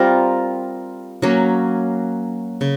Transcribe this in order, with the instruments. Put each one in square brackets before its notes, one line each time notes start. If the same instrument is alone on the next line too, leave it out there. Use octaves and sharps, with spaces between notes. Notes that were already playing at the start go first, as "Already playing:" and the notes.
Already playing: [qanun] G3 C4 F4 A#4
F#3 A#3 C#4
C#3